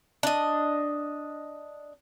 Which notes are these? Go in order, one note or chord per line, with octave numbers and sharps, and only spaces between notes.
D4 D#5